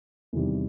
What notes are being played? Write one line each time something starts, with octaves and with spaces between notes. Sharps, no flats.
E2 C3 D#3 G3